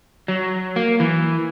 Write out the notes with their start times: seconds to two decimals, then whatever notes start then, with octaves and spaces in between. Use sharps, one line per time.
0.28 F#3
0.76 A#3
1.00 E3